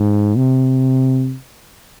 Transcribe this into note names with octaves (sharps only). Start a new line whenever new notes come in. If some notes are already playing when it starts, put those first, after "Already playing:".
Already playing: G#2
C3